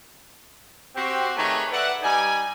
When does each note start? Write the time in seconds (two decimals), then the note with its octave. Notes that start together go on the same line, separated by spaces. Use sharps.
0.95 C4 F#4 G4
1.37 D#3 A3 G4 G#4 B4 C#5
1.72 A4 B4 D5 E5 F#5
2.02 G3 D#4 D5 G#5